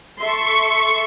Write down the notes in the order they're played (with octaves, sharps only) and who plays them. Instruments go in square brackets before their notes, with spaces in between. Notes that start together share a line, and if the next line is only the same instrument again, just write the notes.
[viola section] A4 E5 C6 [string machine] C#6